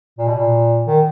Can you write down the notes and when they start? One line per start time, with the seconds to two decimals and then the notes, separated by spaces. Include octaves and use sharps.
0.19 A#2
0.28 B2
0.36 A#2
0.87 D#3